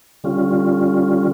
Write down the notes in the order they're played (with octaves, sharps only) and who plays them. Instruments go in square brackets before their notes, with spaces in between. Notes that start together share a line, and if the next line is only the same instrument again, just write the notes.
[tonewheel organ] D3 G3 C#4 F4